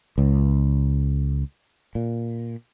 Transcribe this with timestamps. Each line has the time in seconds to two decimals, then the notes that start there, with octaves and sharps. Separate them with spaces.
0.18 C#2
1.95 A#2